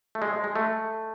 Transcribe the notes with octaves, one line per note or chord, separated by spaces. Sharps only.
A3
G#3
G#3
A3